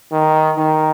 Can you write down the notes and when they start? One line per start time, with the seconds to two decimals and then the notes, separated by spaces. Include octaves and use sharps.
0.12 D#3
0.58 D#3